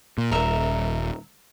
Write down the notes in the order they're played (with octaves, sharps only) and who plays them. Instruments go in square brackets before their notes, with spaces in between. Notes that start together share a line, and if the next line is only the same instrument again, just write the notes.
[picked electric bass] A#2
[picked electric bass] D#1 [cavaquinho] A#4 E5